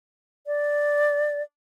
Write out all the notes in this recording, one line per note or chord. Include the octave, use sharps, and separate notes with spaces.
D5